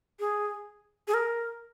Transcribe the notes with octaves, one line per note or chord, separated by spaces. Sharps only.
G#4
G#4
A#4